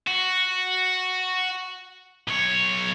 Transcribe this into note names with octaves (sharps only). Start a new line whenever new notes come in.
F#4
B1 C#5